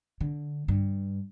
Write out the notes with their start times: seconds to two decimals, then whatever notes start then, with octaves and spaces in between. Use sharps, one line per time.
0.21 D3
0.68 G2